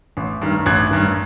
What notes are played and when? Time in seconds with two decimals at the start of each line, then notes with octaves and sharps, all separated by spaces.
0.17 A1
0.42 G2 D#3
0.66 A1 F#6 G#6
0.91 G2 D#3